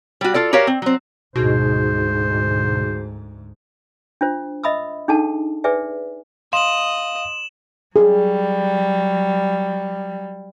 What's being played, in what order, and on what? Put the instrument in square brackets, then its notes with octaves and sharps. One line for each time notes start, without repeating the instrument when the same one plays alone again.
[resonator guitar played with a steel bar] G3 F#4
F4 A4 D5
F#4 G4 A#4 C#5 F5
C4
F#3 C4
[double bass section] D2 G#2 [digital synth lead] B2 [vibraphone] D#4 F#4 G#4 [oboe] C5
[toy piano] D4 F4 C5
D#5 E5 B5 D#6 E6
D4 D#4 G#4 A4 F#5 A5
G#4 B4 D5 E5 G#5
[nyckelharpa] D#5 [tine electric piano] F5 [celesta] C6 [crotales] E7 F#7
[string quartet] F#3 G3 [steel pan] G#4